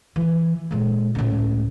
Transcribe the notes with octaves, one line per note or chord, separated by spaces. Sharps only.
E3
A#2 G#3
C#2 A2